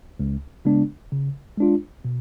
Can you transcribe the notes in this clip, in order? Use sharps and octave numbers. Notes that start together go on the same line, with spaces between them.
C#2
C#3 G#3 B3 D4
C#3
G#3 D4 F4
B2